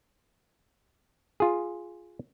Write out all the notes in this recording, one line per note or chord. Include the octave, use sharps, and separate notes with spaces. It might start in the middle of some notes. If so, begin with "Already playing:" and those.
F4 G#4